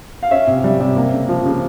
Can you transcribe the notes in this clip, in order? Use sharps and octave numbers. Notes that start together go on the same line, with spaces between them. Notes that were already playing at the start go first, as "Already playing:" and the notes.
F5
C#4 E5
C3
G3
C3
A#3
C#3
F3
C#3